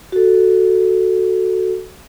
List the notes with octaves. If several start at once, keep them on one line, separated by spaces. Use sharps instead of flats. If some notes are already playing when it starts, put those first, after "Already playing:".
F#4 A4